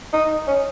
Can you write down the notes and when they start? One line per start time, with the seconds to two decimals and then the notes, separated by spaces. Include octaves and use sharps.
0.13 D#4
0.47 C#4